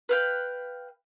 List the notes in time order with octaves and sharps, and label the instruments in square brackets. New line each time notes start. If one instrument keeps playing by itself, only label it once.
[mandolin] B4 F5 G5